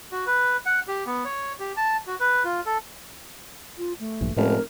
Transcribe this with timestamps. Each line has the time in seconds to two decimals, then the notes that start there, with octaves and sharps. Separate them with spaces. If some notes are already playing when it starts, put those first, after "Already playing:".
0.12 F#4
0.27 B4
0.66 F#5
0.88 G4
1.06 B3
1.25 C#5
1.60 G4
1.77 A5
2.07 F#4
2.20 B4
2.44 F4
2.66 A4
3.78 F4
4.00 A3
4.21 A#1 G2 E3
4.36 F1 A2 G#3 C#4 A#4